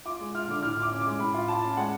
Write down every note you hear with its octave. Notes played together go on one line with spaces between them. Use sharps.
F4 D6
G#3
F4 F6
D3 D6
A2 F6
F4
D6
C#4
G#3 D6
A2 B5
F4
F4 A5
C#4
G#3 F#5